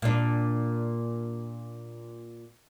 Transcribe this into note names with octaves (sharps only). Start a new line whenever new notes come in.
A#2 D4